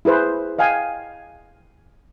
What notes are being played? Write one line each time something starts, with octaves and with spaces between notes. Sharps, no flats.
E4 G#4 B4 C5
D#5 F5 G5 G#5